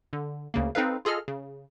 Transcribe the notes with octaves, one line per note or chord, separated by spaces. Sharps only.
D3
D2 C#3 A#3
C4 D#4 A4 B4 F5
F4 G#4 A4 D#5 F6
C#3